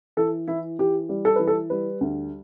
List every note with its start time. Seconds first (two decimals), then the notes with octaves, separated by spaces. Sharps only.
0.17 E3 A4
0.48 E3 E4
0.79 E3 G4
1.09 G3
1.25 A4
1.36 E3 B4
1.47 A4
1.70 G3 B4
2.01 D2